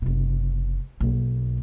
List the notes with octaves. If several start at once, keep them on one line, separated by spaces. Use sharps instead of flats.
F#1 C3
B1 A#3